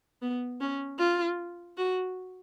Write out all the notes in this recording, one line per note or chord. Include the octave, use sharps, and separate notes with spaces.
B3
C#4
F4
F#4